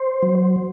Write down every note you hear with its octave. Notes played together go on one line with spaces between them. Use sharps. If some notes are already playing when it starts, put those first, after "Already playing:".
Already playing: C5
F#3